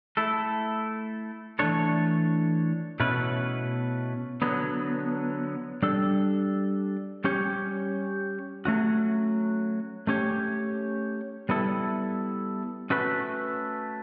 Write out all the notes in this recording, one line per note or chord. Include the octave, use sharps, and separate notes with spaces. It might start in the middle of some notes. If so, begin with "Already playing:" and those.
A3 E4 A4
E3 A3 D4 A4 C#5
B2 A3 C#4 E4 B4
D3 F#3 B3
G3 D4 A4
G3 C#4 G4 C#5
F#3 A3 C#4 F#4
A3 C#4 G4 C#5
G3 B3 E4 A4
A3 C#4 F#4 B4